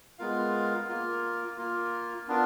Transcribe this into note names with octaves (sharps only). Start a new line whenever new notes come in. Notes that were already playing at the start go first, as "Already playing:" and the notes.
G#3 B3 F4 A#4 F5
A#3 F4 A#4
A#3 F4 A#4
B3 D4 F4 A#4